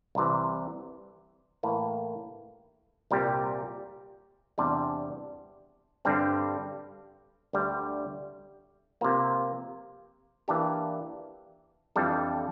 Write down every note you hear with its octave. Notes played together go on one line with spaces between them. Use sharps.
C2 C3 E3
A2 E3 A#3
C2 A#2 G3 C4 G4
E2 C3 G3 D4
G2 D3 G3 C4
D2 D3 G3
C3 F3 A#3
E3 A#3 D4 G4
F2 E3 G3 D4 A4